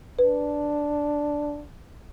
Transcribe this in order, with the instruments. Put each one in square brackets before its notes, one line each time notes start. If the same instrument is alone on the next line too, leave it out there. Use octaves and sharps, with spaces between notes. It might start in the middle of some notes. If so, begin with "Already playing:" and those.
[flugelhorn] D4 [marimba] B4